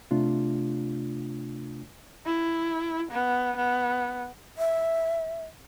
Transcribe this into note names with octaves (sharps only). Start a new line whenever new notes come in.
C3 A3 D4 F4
E4
B3
B3
E5